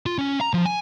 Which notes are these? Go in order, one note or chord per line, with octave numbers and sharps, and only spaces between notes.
F4
C#4
A#5
F3
G#5